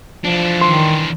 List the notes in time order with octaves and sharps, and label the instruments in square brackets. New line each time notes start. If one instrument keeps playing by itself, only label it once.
[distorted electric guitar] E3 D4 [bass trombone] F3
[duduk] D#3 [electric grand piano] C6